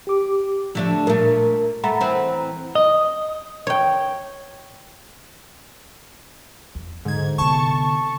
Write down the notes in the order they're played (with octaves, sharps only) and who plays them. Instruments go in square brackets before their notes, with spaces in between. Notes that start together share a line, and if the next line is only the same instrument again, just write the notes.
[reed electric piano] G4 D6
[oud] D3 A3 D4 [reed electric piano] F3
[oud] A#2 A3 [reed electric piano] A#4
[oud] A3 [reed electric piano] F#5 A#5 B5
[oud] E3 C4
[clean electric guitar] D#5
[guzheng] C#5 G5
[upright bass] E2
[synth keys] G#2 G#6 [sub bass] D3
[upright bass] C3 B3 [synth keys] A5 C#6